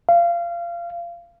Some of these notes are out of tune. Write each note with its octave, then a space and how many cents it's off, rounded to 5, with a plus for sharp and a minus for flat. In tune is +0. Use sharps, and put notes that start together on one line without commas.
F5 -25